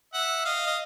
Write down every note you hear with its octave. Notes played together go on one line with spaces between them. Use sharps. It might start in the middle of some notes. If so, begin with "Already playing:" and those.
E5 F#5
D#5 F5
D#5